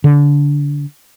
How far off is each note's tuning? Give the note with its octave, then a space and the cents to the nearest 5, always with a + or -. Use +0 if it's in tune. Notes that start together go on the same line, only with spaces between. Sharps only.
D3 -25